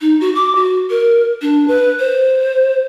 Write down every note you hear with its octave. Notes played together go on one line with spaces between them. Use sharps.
D#4
F#4
D6
F#4
A#4
D4
B4
C5